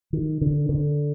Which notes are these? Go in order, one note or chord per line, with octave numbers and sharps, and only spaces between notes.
D#3
D3
D3